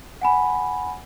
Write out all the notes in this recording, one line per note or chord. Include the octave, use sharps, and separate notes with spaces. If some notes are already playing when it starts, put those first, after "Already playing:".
F#5 G#5 B5